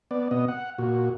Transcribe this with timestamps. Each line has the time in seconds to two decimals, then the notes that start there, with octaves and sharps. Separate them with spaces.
0.11 B3 D5
0.31 B2 B3 D#5
0.48 F#5
0.78 A#2 F#4